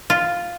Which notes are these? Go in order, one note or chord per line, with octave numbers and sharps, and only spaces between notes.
F4